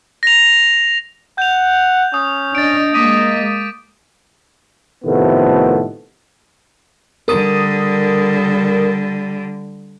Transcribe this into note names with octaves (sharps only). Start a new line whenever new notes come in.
A#6 F7
F#5 G6 F7
C#4 D#6
D4 D#5 A6 D7
G#3 A#3 D#5 D6 B6 D#7
A2 C3 D#3 F3 A3 B3
D3 G3 A#4 D#6